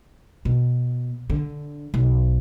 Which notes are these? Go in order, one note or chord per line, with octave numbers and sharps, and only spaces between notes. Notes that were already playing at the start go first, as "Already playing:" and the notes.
B2
D3
B1